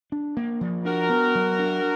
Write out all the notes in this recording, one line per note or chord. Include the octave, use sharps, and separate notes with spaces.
D4
A#3
F3
D4 F#4 A#4
B3
F#3
D4